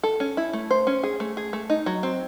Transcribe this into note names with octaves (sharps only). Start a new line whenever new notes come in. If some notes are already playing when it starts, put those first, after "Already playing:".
A4
C#4
E4
A3
C5
C#4
G#4
A3
G#4
A3
D#4
F#3
C4